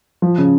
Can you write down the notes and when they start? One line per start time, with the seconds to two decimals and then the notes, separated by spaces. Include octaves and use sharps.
0.22 F3
0.38 C#3